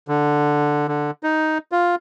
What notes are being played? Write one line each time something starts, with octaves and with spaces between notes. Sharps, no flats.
D3
D3
D#4
F4